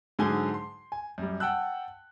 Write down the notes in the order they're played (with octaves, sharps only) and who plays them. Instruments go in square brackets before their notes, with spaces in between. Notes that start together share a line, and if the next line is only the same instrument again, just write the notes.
[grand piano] G#2 D3 F#3 G#4 G#5 G7
C6
G#5
F#2 G3
F#5 G5 A5 E6 F#6